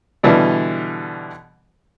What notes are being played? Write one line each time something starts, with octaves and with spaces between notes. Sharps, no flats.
B2 D3 E3 G3